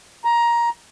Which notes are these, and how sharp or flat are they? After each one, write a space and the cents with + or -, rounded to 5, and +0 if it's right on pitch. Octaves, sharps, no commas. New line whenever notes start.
A#5 +15